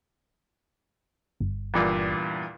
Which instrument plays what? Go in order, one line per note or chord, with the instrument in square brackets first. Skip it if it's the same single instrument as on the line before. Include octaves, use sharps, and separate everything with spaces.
[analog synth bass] G1
[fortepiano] E2 G2 A#2